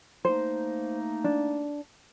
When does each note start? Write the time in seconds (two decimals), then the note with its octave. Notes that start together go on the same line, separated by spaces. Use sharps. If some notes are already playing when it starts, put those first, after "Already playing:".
0.25 A3 A#3 D#4 C5
1.24 D4